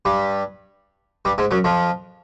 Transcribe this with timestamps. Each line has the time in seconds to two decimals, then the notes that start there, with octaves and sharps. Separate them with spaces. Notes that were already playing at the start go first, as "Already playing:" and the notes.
0.05 G2 G3
1.25 G2 G3
1.38 G#2 G#3
1.51 F#2 F#3
1.64 F2 F3